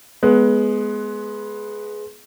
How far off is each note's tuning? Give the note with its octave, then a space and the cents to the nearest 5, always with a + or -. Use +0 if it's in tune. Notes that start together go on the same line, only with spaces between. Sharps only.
G#3 +20 B3 +0